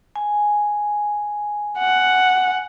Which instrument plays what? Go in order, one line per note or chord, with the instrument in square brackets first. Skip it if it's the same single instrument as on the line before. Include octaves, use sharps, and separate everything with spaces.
[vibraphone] G#5
[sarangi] F#5